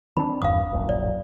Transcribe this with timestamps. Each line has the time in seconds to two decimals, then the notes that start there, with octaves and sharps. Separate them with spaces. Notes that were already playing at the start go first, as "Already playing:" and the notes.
0.17 D#3 C4 D4 B5
0.42 G1 E2 G2 F5 D#6
0.72 D1 A#1 F#2
0.89 D5